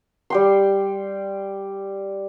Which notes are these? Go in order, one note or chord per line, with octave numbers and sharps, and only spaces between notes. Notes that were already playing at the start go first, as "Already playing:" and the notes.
G3 G5 C6